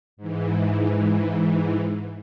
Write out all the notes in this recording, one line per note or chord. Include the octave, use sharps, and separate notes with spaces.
G#2 E3